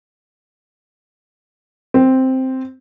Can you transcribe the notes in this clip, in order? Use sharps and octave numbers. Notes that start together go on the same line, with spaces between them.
C4